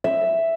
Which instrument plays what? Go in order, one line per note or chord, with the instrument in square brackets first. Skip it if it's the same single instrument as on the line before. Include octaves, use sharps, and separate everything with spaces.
[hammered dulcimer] E5